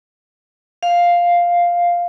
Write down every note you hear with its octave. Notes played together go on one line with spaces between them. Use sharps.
F5